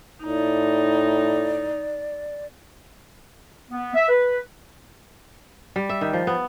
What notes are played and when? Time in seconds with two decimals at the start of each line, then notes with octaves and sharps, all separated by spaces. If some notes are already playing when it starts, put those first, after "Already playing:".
0.25 A2 D#4 D5
3.71 B3
3.95 E5
4.09 B4
5.76 G3
5.89 E5
6.01 D#3
6.13 F3
6.27 B3